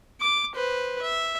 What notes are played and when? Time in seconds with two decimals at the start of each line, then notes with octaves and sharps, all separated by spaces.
0.21 D6
0.55 B4 C5
1.02 E5